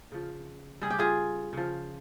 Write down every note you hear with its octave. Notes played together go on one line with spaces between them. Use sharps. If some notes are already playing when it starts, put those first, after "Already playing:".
C#3 F3
C#3 G3 G#4
G4
F4 G#4
C#3 F3